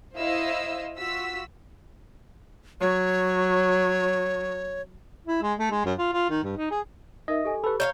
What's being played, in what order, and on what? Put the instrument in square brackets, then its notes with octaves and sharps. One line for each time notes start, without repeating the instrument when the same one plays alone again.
[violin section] E4 C5 D#5 F5 E6
F4 F#4 E6 B6
[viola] F#3 [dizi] C#5
[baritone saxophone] E4
G#3
A3
G#3
F#2
F4
F4
D#3
G2
D#4
G#4
[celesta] D#4 A#4 E5 [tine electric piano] D#5
[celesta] G4 A4 G#5
[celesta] G4 B5 [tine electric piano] A4 B4
[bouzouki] C#5 E5 F5 [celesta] A#5 [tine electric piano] G6